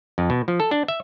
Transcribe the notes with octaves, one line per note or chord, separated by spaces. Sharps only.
F2
B2
F3
A4
D4
E5